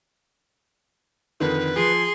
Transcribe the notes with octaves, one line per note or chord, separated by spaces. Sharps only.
F2 D3 D#3 B4
F3 G#4 C6